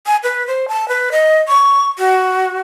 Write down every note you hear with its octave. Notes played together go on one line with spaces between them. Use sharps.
G#5
B4
C5
A5
B4
D#5
C#6
F#4